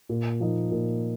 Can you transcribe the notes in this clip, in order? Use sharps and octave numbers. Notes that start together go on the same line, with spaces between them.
A#2
F3 A#3 D#4
A#2